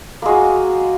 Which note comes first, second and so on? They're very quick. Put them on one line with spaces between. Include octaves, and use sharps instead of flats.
A#3 G#3 F#4